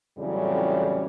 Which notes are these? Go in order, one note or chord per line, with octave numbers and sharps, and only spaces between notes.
F2 A2 C#3 E3 F#3 G3